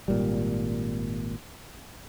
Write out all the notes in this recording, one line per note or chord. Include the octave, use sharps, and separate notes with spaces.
G#1 A#2 G3